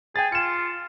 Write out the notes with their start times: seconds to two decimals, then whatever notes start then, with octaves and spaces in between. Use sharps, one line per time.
0.16 G#4 G5 G#5 A6
0.32 F4 C#7 E7